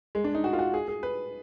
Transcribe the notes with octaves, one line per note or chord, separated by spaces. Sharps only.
G#3
D4
D#4
F#4
F4
F#4
G#4
G#4
B4